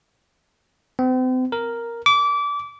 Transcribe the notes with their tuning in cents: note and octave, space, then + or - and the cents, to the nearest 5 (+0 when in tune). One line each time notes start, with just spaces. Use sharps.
C4 -40
A#4 +0
D6 -25